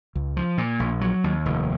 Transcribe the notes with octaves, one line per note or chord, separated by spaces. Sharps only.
C#2
F3
A#2
A#1
F#3
D#2
F1